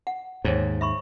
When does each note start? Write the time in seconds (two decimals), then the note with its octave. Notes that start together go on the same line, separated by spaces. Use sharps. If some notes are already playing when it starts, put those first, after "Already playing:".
0.07 F#5
0.45 D#2 G#2 C5 C#5
0.81 E5 B5 C#6